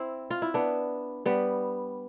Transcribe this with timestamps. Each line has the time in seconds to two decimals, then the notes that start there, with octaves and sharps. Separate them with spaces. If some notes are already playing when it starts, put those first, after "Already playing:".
Already playing: C4 E4
0.30 F4
0.42 E4
0.54 B3 D4
1.25 G3 B3